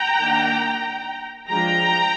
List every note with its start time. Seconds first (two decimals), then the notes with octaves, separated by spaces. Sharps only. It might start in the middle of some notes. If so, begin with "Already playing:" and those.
Already playing: G5 A#5
0.19 D#3 A#3 D4
1.49 F3 G#3 D4 G5 A#5